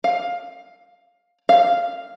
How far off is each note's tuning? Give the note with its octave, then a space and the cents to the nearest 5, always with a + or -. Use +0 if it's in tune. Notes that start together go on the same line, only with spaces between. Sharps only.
F5 +15
F5 -5